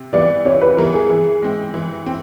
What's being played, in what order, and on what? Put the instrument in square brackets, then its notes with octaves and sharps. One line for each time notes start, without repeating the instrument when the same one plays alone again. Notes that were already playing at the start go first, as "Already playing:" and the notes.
Already playing: [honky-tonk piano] C3
[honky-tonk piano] E3 G3 B3 [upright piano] D5
[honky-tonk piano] C3 [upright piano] C#5
[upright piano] B4
[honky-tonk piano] E3 G3 B3 [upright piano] A#4
[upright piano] G#4
[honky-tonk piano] E3
G#3 C4
E3
C4